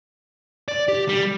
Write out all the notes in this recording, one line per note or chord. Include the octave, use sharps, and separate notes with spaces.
D5
G4
G3